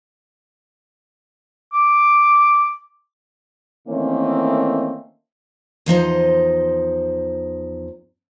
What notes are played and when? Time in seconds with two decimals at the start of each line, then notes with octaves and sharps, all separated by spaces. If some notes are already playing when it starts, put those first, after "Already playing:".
1.73 D6
3.87 D#3 E3 A3 A#3 C4 C#4
5.86 E2 F3 D#4 C5